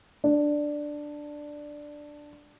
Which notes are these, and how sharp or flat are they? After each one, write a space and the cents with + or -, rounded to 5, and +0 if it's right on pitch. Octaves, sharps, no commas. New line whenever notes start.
D4 +5